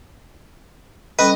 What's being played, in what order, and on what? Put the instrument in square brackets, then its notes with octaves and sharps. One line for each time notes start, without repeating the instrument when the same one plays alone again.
[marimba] G3 C#4 A4 [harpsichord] B4 [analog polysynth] D#5